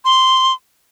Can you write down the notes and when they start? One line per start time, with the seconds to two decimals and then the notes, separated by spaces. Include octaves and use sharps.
0.05 C6